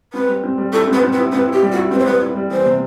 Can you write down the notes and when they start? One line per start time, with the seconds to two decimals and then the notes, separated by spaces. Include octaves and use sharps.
0.13 C4 B4
0.28 G3
0.44 C4
0.58 G3
0.72 E4 A4
0.87 C4
0.93 B4
1.03 C4
1.12 B4
1.18 E4
1.32 C4 B4
1.47 E4
1.53 G4
1.62 G3
1.72 F#4
1.77 E4
1.91 C4 B4
1.98 C5
2.05 G3 B4
2.21 E4
2.35 G3
2.50 E3 C5
2.66 C3